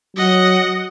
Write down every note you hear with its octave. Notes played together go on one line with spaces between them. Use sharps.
F#3 D#5 F#5